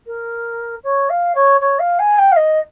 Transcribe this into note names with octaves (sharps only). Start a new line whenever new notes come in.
A#4
C#5
F5
C#5
C#5
F5
G#5
G5
F5
D#5